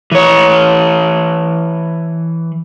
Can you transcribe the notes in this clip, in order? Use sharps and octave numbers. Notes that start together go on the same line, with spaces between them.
E3 C#5